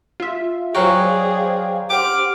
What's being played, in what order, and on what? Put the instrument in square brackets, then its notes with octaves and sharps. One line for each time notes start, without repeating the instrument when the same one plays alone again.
[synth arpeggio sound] F4 E5
[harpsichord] F#3 F#4 [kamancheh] G#4 D5 [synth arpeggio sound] C5 F5 G5
[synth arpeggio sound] G4 C5 [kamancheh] F#5 F6 [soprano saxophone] D6